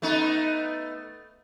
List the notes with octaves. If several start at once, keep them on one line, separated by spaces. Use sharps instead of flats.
A3 B3 D#4